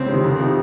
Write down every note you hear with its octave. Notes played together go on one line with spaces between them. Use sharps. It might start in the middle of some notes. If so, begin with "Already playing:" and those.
Already playing: C#2 C4
C3 D#3
F2
C3 D#3